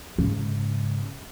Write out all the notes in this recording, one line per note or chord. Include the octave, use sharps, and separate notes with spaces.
G#2 C#3